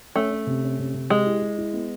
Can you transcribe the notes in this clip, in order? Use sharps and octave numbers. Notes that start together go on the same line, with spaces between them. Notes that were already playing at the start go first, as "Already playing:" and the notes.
A3 C#4
C#4
C3
C#4
C3
C3
G#3 G4
E4
E4
E4
B3